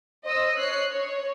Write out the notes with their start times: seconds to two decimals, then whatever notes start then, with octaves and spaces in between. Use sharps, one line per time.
0.25 C5 D#5 D#6 E6
0.54 C#5 F#6 C7
0.86 C#5